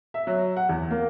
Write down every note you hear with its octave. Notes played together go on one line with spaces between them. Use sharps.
E5
F#3
F#5
E2
A#3